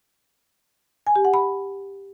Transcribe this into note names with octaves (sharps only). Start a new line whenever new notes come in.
G#5
G4
F#5
B5